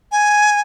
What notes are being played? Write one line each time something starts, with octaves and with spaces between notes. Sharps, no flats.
G#5